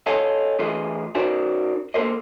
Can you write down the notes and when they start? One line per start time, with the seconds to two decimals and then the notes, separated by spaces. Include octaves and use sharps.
0.06 A4 C#5 D#5 F5 G#5 A5
0.59 A2 E3 F4 G#4 D#5
1.15 C#4 D#4 F#4 A#4 C5 D5
1.94 A#3 A4 A#4 C5 D#5